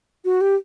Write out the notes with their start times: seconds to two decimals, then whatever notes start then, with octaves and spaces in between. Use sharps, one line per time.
0.25 F#4
0.41 G4